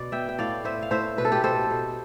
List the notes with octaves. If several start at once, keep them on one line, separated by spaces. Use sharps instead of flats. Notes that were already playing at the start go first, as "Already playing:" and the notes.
Already playing: B2 D5
B3 E5 G5
G5
A2 D5 F5
B3 C5 E5
F5
A2 C5 E5
B2 B4
A4
G4 B4
B2 A4 C5
B2